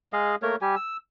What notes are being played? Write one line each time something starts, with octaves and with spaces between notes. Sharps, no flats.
G#3 G#4 D#5 F5
A3 A#3 A#4 C#5
G3 G4 G#5
E6